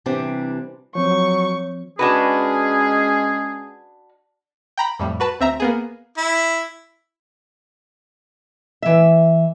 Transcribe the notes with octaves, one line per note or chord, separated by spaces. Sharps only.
C3 E3 G3 C4 D4
F3 F#3 C4 C#5 C#6
G#3 C#4 D4 F#4 G#4 B4
G5 A#5 B5
F2 A2 G3
F#4 B4 A5
D2 C4 E5 A#5
A#3 B3 G#4
E4
E3 E5